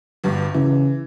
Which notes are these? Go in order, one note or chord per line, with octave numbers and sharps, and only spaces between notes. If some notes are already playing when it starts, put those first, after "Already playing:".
G1 G2
C#3 E3